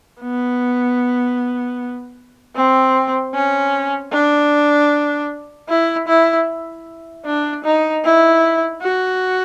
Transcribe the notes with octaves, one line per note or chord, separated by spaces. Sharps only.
B3
C4
C#4
D4
E4
E4
D4
D#4
E4
F#4